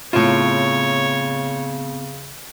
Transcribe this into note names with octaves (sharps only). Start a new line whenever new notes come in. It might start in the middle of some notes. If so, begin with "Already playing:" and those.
A2 C#3 B3 C4 F4 C#5